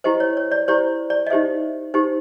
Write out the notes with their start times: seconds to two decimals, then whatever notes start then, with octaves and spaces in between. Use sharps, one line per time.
0.04 E4 G4 C5 D#5
0.20 C#5
0.37 C#5
0.51 D5
0.68 E4 G4 C5 D5
1.10 D5
1.27 D#5
1.30 D#4 G4 C5 E5
1.94 D#4 G4 C5